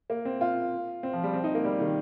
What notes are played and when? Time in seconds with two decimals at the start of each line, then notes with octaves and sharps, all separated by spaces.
0.10 A#3
0.25 C4
0.41 F4
1.03 C4
1.13 F3
1.23 G3
1.34 C4
1.44 D#4
1.55 A#3
1.65 G3
1.80 D#3